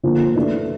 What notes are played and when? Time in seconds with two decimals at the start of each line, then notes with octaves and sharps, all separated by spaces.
0.03 D3 F3 A#3
0.35 E3 A3 D4 F#4